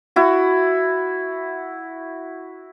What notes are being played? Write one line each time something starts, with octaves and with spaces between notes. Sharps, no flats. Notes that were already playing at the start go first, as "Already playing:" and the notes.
E4 F#4